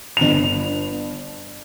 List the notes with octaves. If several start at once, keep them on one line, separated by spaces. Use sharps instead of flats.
G1 F7